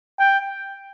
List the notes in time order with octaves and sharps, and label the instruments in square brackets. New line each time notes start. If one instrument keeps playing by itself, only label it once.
[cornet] G5